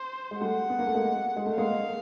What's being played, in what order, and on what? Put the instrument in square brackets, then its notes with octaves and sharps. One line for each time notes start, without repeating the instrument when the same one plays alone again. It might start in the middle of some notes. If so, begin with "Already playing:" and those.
Already playing: [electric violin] C5
[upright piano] G#3
[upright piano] G3 A3 [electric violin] F#5
[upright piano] B3
A#3
A3
G#3 A#3
G#3
A3
[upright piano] G#3 A#3 [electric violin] F5